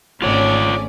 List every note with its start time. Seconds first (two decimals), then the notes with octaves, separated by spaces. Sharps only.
0.22 G#1 A3 C#4 F4 C#5 D5 D6